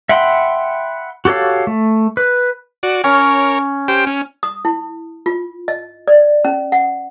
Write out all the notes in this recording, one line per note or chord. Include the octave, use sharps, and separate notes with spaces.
E5 F#5 G5 B5 C6
F#4 G4 A4 C#5 F5
A3
B4
F#4 D5
C#4 A#4 C#5
G4 C5 G5
C#4
D#6
E4
F4
D#5
D5
C#4
F#5